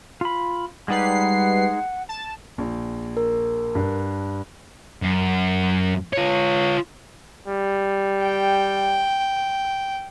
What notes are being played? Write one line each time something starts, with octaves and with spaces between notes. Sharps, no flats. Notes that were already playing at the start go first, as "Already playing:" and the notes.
F4 B5
G3 G#3 D#4 B4 F#5 C7
A5
A#1
A#4
G2
F#2
F4 C#5
G3
G5